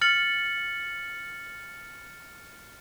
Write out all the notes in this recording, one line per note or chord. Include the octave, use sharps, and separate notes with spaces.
F6 A6 C#7 F#7